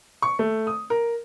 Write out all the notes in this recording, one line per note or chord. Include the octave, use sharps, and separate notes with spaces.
C#6
A3
D#6
A#4